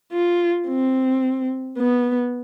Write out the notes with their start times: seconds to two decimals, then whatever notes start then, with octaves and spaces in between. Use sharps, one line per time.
0.12 F4
0.68 C4
1.78 B3